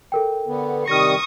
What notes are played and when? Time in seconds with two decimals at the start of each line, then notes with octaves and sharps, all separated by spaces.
0.12 A4 A#4 G5
0.47 D3 B3
0.88 C3 D#3 G3 C#6 D#6 F6 A#6